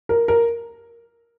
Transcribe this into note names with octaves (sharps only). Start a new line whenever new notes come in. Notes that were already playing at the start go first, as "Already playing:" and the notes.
A#4
A#4